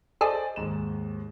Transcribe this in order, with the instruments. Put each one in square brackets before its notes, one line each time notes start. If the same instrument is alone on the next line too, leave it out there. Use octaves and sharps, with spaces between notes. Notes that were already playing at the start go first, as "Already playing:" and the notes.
[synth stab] G#4 A4 [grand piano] C5 D5 D#5
[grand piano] D#2 G#2 E7